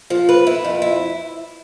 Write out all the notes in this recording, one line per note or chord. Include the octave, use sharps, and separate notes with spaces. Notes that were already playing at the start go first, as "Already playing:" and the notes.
F3
B4
E4
F2
E4